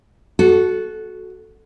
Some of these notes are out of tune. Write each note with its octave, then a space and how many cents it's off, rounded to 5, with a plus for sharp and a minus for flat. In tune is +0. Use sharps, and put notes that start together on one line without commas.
F#4 +0 A4 -20